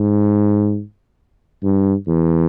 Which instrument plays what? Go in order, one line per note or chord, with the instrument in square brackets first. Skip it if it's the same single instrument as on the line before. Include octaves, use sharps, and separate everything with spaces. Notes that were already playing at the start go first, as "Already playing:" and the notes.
Already playing: [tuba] G#2
G2
E2